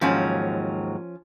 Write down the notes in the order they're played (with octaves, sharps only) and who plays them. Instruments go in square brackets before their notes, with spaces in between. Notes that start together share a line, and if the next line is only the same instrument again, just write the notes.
[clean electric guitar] D#2 G#2 F#3 [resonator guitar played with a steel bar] F3 C#4